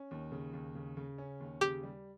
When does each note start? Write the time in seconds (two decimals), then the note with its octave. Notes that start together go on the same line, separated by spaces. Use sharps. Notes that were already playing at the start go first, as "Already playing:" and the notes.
Already playing: C#4
0.11 D#2
0.32 C#3
0.53 D#2
0.75 C#3
0.97 C#3
1.18 C#4
1.40 D#2
1.61 C#3 G4
1.83 G3